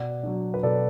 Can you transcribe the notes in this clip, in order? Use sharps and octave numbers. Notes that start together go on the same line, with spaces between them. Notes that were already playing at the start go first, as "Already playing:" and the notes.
Already playing: B2 D5 F#5
F#3 D4
B4
B2 A4 D5